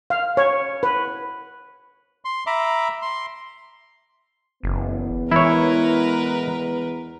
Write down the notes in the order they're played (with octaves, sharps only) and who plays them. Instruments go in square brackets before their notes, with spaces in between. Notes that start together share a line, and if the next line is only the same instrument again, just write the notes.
[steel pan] F5
C#5
B4
[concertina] C6
E5 A#5 B5 D6
C6
[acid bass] F#1 [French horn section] E2 B3
[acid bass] E3 [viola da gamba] G#3 A#4 B4 [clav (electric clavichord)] E4 C#5